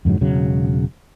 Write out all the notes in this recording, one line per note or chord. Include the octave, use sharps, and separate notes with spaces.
F2 G#2 D3 F#3
E1 C#3 F#3